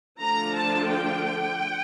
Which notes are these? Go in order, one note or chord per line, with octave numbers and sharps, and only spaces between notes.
D3 F3 A3 D4 F4 A#5
A5
G5